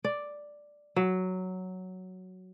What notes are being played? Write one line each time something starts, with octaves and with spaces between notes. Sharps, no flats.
D5
F#3